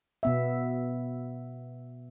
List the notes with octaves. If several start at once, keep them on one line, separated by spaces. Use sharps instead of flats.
B2 B3 E5